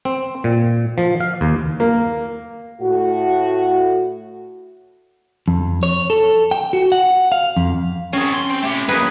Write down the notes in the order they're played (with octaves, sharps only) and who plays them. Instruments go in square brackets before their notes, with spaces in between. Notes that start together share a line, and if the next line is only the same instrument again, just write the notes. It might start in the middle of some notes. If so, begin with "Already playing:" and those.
[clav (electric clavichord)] C4
A#2
F3
F5
D#2
[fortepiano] A#3
[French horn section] A2 F#4
[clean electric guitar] F2
C#5
A4
G5
F#4
F#5
F5
F2
[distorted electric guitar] C4 G#4 [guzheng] C#4
[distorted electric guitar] C6
C4
A3 G4
[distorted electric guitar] F#3 A#3 [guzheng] G#4 B4